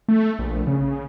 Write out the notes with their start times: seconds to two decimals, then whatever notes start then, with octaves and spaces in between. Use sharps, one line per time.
0.08 A3
0.39 A#1
0.67 C#3